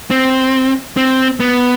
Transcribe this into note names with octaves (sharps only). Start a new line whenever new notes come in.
C4
C4
B3